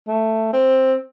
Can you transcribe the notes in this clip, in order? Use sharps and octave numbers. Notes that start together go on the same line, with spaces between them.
A3
C4